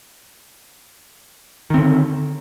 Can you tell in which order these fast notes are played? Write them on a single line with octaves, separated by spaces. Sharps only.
D#3 C4 D3